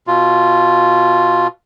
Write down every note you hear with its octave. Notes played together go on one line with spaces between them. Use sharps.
B2 F4